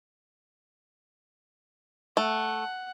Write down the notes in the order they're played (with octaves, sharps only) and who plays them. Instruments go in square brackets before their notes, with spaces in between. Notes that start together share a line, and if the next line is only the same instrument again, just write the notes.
[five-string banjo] A3 [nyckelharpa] F#5